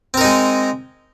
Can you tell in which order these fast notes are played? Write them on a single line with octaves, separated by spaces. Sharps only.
C4 A#4 D#4 G#3